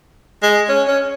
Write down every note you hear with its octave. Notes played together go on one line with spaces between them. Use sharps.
G#3
C#4
C#4